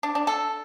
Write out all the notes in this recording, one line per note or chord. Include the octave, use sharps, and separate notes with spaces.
D4
D4
A4